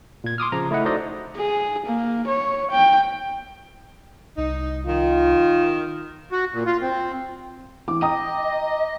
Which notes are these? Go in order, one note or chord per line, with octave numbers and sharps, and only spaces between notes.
A#2 G#6
C6 D6 D#6 F6
C#3 F3 A#5
A3 E4 D#5 F#5
D#4 F#4 A4 C5 D5 D#5
G#4
A#3
C#5
G5
C2 D#4
D#3 F4
F#4
A#2
F4
C4
E3 D6
D#5 G5 A#5 D#6